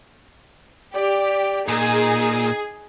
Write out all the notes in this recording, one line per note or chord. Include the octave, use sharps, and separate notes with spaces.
G4 D5
A#2 D#4 G#4